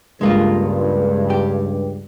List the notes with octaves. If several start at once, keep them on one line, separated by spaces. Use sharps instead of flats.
C#2 G2 G#3 A#3 F4
G4